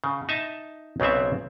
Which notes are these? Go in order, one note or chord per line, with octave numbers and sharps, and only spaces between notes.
C#3
D#4 E5 A5
B1 C#3 B3 C4 E5